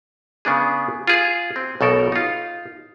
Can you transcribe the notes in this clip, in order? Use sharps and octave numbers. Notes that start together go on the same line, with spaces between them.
C#3 B3 D4 G#4
F4 G#4
C4
B1 B2 A4 A#4
D#4 F4